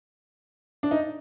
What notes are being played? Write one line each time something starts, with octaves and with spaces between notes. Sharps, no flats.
D4
D#4